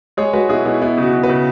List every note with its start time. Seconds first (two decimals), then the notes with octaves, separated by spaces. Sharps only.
0.17 G#3 G#4 C#5
0.33 G#3 F#4 B4
0.49 B2 E4 G#4
0.65 B2 E4
0.81 B3 E4
0.97 C#3
1.03 F#4
1.13 C#3
1.23 F#4 B4
1.29 C#3